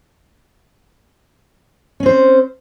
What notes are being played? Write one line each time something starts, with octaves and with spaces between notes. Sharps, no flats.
C4 C#4 C5